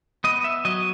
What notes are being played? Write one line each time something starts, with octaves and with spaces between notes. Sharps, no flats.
B3 D#5
E5
F#3 D#5